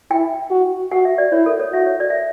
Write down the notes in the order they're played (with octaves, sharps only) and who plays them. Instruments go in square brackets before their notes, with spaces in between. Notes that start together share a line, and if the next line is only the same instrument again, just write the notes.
[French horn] E4 [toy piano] G5
[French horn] F#4
[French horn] F#4 [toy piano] F#5
[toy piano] E5
D5
[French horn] E4 [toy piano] C#5
[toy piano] A4
C#5
[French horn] F#4 [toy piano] E5
[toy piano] C#5
D5
E5